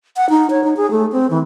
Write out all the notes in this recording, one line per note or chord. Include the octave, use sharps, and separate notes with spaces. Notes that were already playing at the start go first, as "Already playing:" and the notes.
F#5
D#4
C#5
D#4
G#4
A3
C4
E3